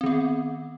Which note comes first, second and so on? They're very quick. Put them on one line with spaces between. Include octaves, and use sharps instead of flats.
C4 D#3 B3